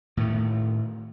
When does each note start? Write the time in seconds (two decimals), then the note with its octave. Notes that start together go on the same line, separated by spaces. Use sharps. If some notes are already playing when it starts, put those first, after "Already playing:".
0.17 A2 D#3 A3